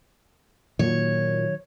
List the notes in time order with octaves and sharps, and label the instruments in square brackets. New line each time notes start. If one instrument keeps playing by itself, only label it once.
[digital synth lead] A#2 [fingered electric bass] D#3 F#3 [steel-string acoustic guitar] C#5